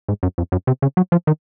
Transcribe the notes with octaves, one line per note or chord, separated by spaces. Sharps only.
G#2
F#2
F2
F#2
C3
C#3
F#3
F3
D#3